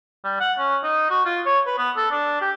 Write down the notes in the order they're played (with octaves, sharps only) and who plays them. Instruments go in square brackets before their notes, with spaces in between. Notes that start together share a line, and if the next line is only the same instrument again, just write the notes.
[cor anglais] G3
F#5
C#4
D#4
F#4
F4
C#5
B4
B3
A4
D4
G4